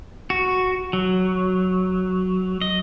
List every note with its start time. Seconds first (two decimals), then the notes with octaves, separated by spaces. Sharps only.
0.30 F#4
0.93 F#3
2.61 D#5